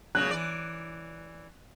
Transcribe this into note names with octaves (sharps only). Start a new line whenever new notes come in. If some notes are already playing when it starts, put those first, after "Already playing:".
A#2 C#3 F#3 F#6
E3 D5